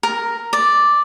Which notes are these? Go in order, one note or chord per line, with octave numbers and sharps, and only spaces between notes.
A#4
D5